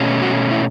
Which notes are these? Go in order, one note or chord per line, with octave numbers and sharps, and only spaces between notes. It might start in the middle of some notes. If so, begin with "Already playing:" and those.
Already playing: B2 A3 C#4
F#4
E4